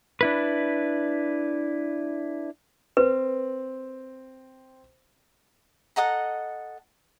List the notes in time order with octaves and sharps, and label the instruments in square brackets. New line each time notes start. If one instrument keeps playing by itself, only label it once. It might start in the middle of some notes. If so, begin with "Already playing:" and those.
[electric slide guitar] D4 E4 B4
[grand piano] C4 [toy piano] B4
[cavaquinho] A4 D#5 F#5 A#5